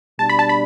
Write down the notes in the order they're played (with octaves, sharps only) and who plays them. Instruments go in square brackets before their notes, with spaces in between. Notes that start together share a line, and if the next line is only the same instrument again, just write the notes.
[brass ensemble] B2 G3 D4 [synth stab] A5
[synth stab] B5
A5
B5